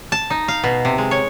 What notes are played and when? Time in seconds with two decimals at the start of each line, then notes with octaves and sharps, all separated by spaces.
0.12 A5
0.30 D#4
0.48 F5
0.64 B2
0.85 C3
0.98 G#3
1.11 C#5